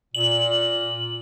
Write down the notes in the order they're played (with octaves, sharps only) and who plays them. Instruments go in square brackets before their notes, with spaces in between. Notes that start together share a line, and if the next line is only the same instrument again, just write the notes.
[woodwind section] A#2 [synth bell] F#7